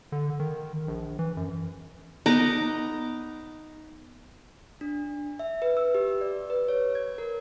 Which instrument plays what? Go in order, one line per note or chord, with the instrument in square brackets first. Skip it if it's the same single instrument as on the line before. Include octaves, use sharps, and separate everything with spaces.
[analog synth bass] D3
D#3
A#1
E3
F#2
[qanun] B3 D#4 A#5 D6
[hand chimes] D4
E5
B4
E6
G4
D5
B4
C#5
G#6
A#4